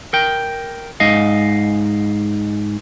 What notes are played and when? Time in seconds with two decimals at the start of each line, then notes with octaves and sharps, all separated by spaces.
0.13 A#4 G5
1.00 G#2 D#5 F5